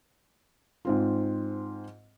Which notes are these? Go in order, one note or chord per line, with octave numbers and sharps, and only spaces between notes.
G#2 C4 F4